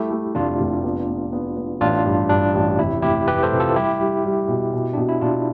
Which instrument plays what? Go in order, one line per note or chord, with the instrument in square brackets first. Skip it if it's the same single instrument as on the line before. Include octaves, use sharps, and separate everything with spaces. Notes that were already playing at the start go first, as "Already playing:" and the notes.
Already playing: [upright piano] G3 A3 [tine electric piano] E4 G4
[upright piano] A3
[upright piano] F1 [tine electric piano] D4 F4
[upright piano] F1
B3
B3
B3
B3
[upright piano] A1 [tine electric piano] D4 F4
[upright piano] G2
[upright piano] G2 [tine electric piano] D4
[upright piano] A1
[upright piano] F1 [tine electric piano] E4
[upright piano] F1 [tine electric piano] E4 G4
[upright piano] F1 [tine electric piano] G4 B4
[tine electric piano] A4 C5
[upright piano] C3
[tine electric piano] F4 A4
[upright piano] G3 [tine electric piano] E4 G4
[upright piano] G3
G3
B2
B2
[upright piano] B2 [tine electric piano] D4
[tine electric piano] E4
[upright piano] B2 [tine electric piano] D4 F4